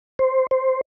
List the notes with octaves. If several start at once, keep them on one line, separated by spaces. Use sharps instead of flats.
C5
C5